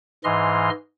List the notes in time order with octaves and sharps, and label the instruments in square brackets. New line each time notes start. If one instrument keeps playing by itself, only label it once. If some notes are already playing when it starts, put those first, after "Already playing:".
[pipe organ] G#2 E3 D#5 C6 F6